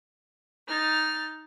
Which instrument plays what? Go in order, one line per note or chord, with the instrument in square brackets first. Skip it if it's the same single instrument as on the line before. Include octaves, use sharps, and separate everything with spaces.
[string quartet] D#4 F6 A6